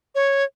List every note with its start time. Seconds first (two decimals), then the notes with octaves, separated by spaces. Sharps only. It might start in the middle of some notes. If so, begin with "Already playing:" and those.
0.15 C#5